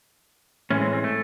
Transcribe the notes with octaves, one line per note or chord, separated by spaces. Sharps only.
A2 E3 G#3 C#4
C4
C4
A3